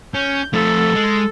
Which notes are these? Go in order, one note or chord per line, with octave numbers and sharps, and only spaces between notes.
C#4 G6
F3 A3 A4
G#3